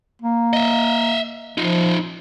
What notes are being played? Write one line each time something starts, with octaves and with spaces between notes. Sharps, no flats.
A#3
D#5 E5
F3 D#4 F4